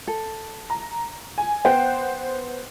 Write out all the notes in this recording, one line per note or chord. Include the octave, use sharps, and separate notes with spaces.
A4
A#5
G#5
B3 C5 F#5 G5